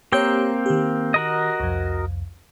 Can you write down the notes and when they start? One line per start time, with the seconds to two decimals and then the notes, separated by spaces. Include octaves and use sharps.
0.12 A#3 C4 G4 C#5 G5 A#5
0.66 D#3 G4
1.14 F#4 A#4 D#5
1.60 C2 F2